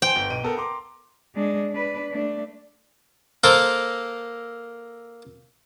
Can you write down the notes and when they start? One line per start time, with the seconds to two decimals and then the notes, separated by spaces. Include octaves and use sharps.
0.02 C5 G5 G#5
0.16 G1
0.30 B1 D7 D#7
0.43 B3 A4 A#4
0.57 A#5 C6 D6
1.35 G#3 D4
1.72 D4 B4
2.11 A3 D4
3.44 A#3 A4 A#4 C5